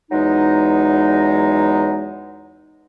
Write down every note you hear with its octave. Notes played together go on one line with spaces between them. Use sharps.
E2 F#3 G#3 D#4